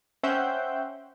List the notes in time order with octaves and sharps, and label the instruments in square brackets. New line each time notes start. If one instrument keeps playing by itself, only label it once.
[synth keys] C#4 C5 E5 F#5 G5 G6